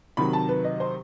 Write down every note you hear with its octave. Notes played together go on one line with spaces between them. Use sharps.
C3 D#3 F#3 B5
A5
B4
D#5
C5